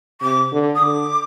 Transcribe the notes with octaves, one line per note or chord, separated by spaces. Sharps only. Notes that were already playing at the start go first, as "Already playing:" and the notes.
C3 D6
D3
D#6
D3 D6